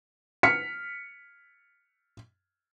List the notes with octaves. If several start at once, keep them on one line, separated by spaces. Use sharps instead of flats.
F6 B6 C#7